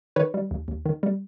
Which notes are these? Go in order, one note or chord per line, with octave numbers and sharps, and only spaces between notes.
D#3 B4 C#5
G3
D#2
D#2
D#3
G3